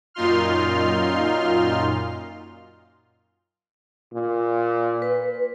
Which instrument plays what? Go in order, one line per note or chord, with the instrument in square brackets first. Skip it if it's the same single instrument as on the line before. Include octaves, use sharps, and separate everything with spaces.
[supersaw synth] F#2 A#2 D#4 F4 C6 F6
[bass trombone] A#2
[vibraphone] B4